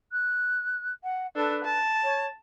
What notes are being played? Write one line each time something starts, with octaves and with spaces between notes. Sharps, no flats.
F#6
F#5
D4 A4 B4
A5
C#5